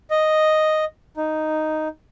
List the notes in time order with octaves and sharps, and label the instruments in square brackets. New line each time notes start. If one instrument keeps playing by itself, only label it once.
[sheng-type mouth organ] D#5
D#4